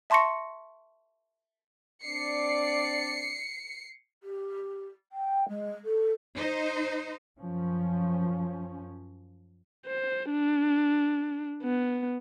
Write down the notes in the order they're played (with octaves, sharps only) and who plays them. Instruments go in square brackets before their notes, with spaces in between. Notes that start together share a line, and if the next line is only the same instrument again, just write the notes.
[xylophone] E5 A5 C6 C#6 A#6 C#7
[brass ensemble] C4 D4 D5 [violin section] C7 C#7
[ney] G4
G5
G#3
A4
[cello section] D#4 C5
[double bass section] F#2 F3 C#4
[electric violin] C5
D4
B3